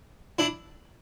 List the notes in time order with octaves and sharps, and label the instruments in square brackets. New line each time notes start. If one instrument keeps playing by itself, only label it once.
[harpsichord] D4 E4